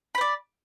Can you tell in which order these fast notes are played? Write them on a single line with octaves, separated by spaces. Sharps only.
B5 C5 D5